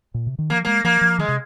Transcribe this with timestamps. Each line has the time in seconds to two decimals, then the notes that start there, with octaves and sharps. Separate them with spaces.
0.14 A#2
0.27 C3
0.39 D#3
0.50 F3 A#3
0.65 G#3 A#3
0.84 F3 A#3
1.01 F3
1.18 D#3 G#3
1.28 C3